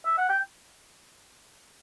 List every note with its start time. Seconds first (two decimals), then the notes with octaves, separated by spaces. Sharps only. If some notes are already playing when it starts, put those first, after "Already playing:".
0.06 E5
0.18 F#5
0.29 G5